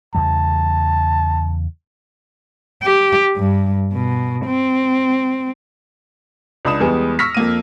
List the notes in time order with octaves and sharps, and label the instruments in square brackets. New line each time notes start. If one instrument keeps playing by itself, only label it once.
[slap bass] E2 C#3 G3 [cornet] A5
[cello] G4
G2
B2
C4
[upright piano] C#2 D4 B5 D#6 E7
E2 G3 G#3 B3 G#5
C#6 E6 F6 A#6 B6
F2 A#3 D#7